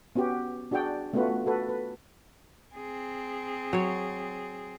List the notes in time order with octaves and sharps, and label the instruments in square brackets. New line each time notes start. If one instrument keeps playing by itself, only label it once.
[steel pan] B3 C#4 F#4 G4
D4 F#4 G#4 D5 G5
A3 B3 C#4 F4 F#4 B4
F#4 A4 B4
B4
[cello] C4 G#4
[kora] F#3 C#5